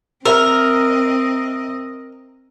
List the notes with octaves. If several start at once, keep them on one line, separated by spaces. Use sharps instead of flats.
C4 A#4 C5 D#5 E5 A#5 E6